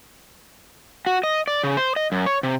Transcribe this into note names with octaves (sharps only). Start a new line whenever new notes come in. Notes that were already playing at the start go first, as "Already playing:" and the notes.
F#4
D#5
D5
C#3
C5
D#5
F#2
C#5
C3